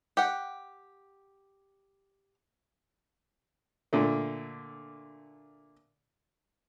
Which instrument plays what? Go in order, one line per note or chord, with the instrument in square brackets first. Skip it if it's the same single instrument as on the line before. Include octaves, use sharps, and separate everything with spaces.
[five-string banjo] G4 F#5
[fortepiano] A#2 D3 A3